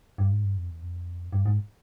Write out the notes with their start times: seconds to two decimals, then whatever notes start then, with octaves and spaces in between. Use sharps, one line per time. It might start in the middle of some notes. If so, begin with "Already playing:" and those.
0.18 G2
0.31 G#2
0.43 G2
0.56 F2
0.69 E2
0.81 F2
1.33 G2
1.46 G#2